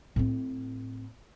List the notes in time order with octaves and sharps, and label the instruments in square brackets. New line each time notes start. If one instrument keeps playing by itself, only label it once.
[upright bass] A2 C4